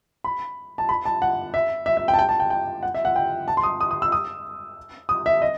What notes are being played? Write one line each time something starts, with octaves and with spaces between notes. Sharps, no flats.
B5
A5
B5
A5
F#5
E5
E5
E5
G5
A5
G5
A5
G5
G5
F#5
E5
F#5
G5
A5
C6
D#6
D#6
D#6
E6
D#6
D#6
E5
D#5